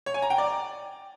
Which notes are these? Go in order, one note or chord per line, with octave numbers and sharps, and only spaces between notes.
C#5
G#5
A#5
G5
D5